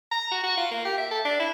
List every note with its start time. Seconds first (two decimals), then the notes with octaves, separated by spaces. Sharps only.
0.11 A#5
0.31 F#4
0.43 F#4
0.57 F4
0.71 A#3
0.85 G4
0.98 E5
1.11 A4
1.25 D4
1.40 E4